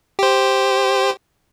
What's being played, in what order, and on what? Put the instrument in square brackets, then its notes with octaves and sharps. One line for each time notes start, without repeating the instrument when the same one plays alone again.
[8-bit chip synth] G4 C5